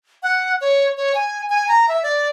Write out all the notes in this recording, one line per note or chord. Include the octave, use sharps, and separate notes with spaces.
F#5
C#5
C#5
G#5
G#5
A#5
E5
D5